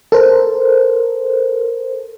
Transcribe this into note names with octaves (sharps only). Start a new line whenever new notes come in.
A4 A#4 C5